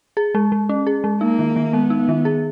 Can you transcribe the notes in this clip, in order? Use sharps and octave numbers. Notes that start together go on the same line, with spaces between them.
G#4
G#3
G#3
C#4
G#4
G#3
A#3 D#4
D#3
D#3
G#3 B3
D#4
D#3
G#4